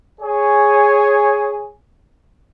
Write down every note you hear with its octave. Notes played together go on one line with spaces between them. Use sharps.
G#4 C#5 G#5